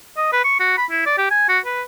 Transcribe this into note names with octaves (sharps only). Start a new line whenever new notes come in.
D#5
B4
C#6
F#4
B5
E4
D5
G4
G#5
F#4
B4